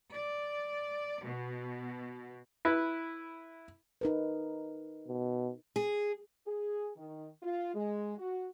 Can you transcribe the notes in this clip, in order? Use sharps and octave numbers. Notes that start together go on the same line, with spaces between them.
D5
B2
E4 B4
D#4 A#4 B4
B2
G#4
G#4
D#3
F4
G#3
F#4